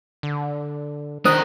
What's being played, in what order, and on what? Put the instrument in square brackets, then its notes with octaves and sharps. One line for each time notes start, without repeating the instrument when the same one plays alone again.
[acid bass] D3
[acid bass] D#3 [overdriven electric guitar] D4 A#4 [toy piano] C5 [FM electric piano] D#6